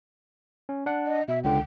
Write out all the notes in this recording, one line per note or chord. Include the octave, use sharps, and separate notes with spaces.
C#4
D4 F#5
D#5
B2 E5
C#2 D3 G5